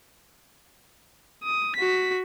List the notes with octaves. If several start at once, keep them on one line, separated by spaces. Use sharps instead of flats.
D#6
F#4 B6